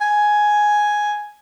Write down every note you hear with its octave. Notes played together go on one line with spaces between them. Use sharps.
G#5